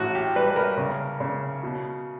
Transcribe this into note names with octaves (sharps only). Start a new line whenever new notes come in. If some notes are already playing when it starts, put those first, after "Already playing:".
Already playing: A1 F#4
G4
G3 B4
B4
A#4
C#3
C#3
B2